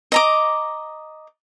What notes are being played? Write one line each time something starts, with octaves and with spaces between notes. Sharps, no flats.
D#5 A#5 D6